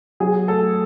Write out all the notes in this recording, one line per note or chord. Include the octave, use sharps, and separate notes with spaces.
F#3 G#4
A3 A4